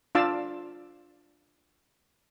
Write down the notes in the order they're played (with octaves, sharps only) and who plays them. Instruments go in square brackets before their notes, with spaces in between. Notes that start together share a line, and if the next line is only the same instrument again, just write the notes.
[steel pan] D4 F4 F5 A5 D6 E6